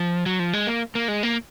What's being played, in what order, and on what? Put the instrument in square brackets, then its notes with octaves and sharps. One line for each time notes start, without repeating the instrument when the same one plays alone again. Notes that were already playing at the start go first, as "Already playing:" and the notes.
Already playing: [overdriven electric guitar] F3
F#3
F3
G#3
A#3
A#3
G#3
A#3